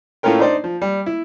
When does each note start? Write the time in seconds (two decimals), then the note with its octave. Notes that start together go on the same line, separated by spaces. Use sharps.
0.23 A2 A3 C#4 F4 A#4 G5
0.39 D4 D#4 C5 D5
0.64 F3
0.82 G3
1.06 E4